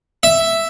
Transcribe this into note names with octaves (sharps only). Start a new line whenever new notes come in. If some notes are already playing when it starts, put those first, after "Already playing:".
E5